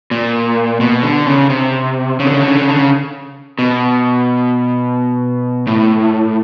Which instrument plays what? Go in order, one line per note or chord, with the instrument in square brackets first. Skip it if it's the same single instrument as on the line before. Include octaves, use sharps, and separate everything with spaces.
[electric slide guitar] A#2
B2
D3
C#3
C3
C#3
D3
C#3
D3
C#3
D3
C#3
D3
C#3
B2
A2